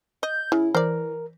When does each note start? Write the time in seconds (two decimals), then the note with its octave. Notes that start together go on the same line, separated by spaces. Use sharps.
0.23 D#5 G6
0.52 C#3 E4
0.75 E3 A#4 C5 D5